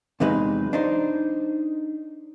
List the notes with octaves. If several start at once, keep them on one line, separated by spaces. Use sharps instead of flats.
E2 C3 F#3 G#3 D#4 B4
D4 D#4 C5